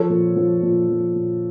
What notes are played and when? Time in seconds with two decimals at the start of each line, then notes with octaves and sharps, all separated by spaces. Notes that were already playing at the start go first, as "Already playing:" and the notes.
Already playing: F3 A4 C#5
0.09 A#2
0.36 F3
0.62 A#2
0.89 F3
1.15 A#2